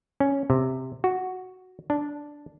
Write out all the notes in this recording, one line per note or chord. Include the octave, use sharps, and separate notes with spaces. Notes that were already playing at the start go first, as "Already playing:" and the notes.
C#4
C3
F#4
D4